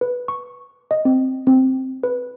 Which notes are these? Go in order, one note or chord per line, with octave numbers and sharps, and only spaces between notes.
B4
C#6
D#5
C4
C4
B4